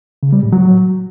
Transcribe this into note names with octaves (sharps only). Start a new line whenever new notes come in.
C#3
G3
A2
F#3